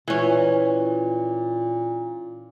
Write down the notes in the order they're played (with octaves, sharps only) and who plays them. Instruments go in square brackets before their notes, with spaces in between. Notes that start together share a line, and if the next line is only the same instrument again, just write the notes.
[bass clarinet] A#2 [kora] E3 C#4